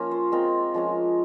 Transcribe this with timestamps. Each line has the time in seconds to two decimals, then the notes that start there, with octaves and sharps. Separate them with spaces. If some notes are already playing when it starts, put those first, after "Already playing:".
Already playing: F3 A#3 C#4 D#4 F4 A#4
0.11 C5
0.32 G#3 C4 F4 A#4
0.74 F3 G#3 C#4